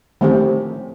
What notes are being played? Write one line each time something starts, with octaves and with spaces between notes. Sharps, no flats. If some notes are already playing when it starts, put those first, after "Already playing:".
D#3 F3 A3 C4 C#4 G4